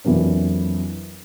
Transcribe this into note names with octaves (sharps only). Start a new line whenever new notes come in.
F2 E3 F#3 A#3 D4